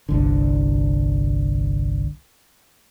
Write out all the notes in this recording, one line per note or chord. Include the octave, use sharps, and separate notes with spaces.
G1 C2 D3